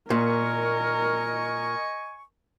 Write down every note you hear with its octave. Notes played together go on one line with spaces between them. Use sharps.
A#2 A#4 D#5 G#5 C#6